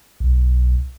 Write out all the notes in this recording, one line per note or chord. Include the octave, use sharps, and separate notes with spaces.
B1